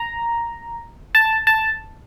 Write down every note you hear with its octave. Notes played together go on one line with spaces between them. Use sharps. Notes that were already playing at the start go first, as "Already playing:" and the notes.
Already playing: A#5
A5
A5